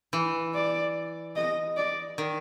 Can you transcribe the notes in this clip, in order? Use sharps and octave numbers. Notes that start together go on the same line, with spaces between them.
E3
D5
D#5
D5
D#3